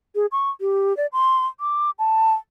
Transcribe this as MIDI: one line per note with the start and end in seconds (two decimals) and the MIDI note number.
0.15 0.26 68
0.32 0.50 85
0.61 0.96 67
0.97 1.06 74
1.13 1.46 84
1.60 1.90 86
1.99 2.34 81